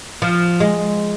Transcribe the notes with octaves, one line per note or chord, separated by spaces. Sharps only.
F3
G#3